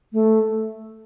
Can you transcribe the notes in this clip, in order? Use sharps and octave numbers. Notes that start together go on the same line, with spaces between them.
A3